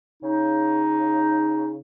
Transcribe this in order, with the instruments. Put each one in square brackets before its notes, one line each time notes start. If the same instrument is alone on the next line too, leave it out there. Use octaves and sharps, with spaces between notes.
[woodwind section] C#3 D#4